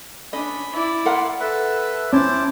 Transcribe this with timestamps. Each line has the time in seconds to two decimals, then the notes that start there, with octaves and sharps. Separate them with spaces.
0.33 C#4 D4 D#5 B5
0.73 E4 D5
1.05 A#4 F#5 C6
1.40 A4 B4 E5
2.13 C#4 E4 C5 A5 D6